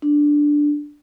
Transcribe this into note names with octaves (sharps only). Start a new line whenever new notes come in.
D4